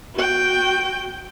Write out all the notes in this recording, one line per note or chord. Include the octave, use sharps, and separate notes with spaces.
F#4 G5